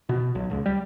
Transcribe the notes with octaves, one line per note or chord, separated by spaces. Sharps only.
B2
B1
C#2
G3